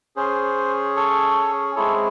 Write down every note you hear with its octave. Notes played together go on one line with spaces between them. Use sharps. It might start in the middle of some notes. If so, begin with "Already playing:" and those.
C#4 G#4 C5
A4 C#5
G#3 C4 E4 G#4 A4 C#5